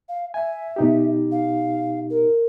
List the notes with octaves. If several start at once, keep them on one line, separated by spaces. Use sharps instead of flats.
F5
E5 G#5
B2 D#4 G4
F5
A#4